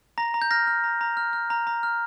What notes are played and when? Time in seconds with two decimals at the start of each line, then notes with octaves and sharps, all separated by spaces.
0.18 A#5 A#6
0.34 A#5
0.42 G6
0.51 F6 A#6
0.67 F6
0.84 A#5
1.01 A#5
1.17 F6
1.33 F6
1.50 A#5
1.67 A#5
1.83 F6